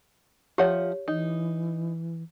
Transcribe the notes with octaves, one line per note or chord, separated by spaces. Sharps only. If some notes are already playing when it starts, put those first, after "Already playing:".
F3 G4 C#5 E5 F#5
E3 D#4